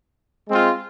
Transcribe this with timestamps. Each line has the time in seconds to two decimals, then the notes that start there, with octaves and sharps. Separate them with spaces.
0.48 G#3 C4 F4